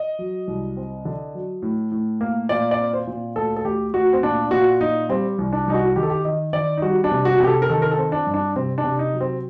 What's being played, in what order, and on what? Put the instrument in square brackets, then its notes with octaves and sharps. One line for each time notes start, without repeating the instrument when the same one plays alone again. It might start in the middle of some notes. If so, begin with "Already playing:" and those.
Already playing: [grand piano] D#5
F#3
C2
C4
D3
F#3
A2
A2
A#3
A#2 D5
D5
C4
C5
A#2
D2 A4
A4
D2 G4
D2 F#4
C4
A#2 D4
A#2 F#4
A#2 D#4
G3 C4
C2
D4
C2 D#4
F#4
D#3 G4
A4
G4
D#3 D#5
D#3 D5
D#4
G3 F#4
D4
C3
F#4
C3 G4
A4
A#4
D#3 A4
A#4
A4
C4
D4
G2
D4
C3 C4
D4
C3
D#4
F#3
C4